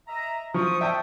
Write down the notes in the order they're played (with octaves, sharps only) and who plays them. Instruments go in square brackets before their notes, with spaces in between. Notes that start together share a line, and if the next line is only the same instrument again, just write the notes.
[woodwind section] D#5 E5 A#5
[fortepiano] F3 [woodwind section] C#6 D#6
[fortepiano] E5 G5 A5